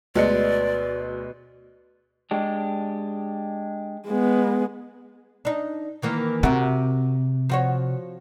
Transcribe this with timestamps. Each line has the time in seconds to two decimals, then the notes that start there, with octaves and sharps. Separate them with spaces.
0.15 D2 B2 G#3 D5 C#7
2.31 G#3 D4 G4
4.07 G#3 B3
5.45 D4 D#4
6.02 D#3 E3 A#3
6.43 C3 F#4 A#4
7.50 F3 F#4 C#5